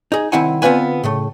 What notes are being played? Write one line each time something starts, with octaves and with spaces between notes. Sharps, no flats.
D#4 G#4
C2 D#3 C4 E4 F#5 G#5
D3 B3 C4 F4 B4 G#5
A2 C#3 A3